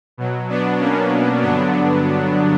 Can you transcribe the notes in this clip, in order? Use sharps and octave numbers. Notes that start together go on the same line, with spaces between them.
B2 F#3
B3 D4
A#3 C#4
G2 D3 F#3 B3 D4